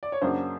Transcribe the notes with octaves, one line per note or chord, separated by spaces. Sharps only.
D5
C#5
F#2 C#3 F#3 A#3 D4 C5